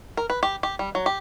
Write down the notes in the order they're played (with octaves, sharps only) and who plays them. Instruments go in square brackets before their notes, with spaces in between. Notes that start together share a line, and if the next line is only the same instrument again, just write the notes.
[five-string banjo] A#4
B4
G4
G4
G3
F#3
G4